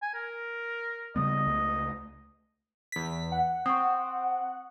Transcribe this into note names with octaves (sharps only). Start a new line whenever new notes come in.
G#5
A#4
C#3 G3 B3 D#5
C#2 A3
E2 B6
F#5
C4 C#6 D#6